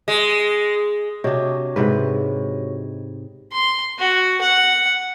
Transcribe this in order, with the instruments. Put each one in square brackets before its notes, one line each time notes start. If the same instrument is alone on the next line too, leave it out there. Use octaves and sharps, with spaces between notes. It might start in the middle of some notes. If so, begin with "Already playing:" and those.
[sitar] G#3
[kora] C3 D4 [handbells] F#4 C#5 D#5
[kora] G#2 C3 B4
[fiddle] C6
F#4
F#5